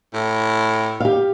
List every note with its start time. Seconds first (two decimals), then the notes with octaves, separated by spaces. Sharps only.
0.13 A2
1.00 G4 F5